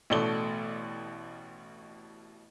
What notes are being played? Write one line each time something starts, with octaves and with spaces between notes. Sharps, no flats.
A1 B2 A3 D5 G7